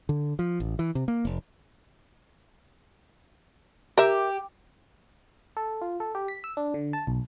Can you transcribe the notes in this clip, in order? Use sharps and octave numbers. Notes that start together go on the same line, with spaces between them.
D3
F3
A1
E3
C3
A#3
F1
G4 A#4 E5
A4
F4
A4
G4
B6
E6
D4
D3
A5
B1